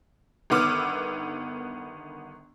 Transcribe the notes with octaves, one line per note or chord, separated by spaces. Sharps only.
G1 D#3 B3 D6 E6 F6